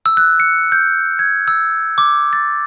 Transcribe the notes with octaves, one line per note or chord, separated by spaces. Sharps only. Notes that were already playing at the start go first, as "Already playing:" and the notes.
E6
F#6
C#7
G6
G#6
E6
D6
A6